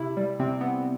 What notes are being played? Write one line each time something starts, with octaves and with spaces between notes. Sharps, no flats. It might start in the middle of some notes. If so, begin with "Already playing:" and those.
Already playing: C3 E4
G3
C3 C4
B3